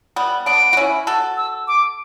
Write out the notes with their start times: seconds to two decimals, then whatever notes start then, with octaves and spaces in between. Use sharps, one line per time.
0.16 G3 B3
0.46 B3 D4 D7
0.73 F#4
0.77 C#4 E4
1.07 F#4 A4
1.37 E6
1.68 D6